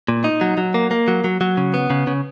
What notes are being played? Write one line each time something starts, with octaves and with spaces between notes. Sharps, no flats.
A#2
D#4
F#3
F#3
A#3
A#3
F#3
F#3
F#3
C#3
B3
C#3
C#3